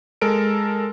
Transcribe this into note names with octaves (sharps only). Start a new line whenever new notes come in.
G#3 A4 A#4 D7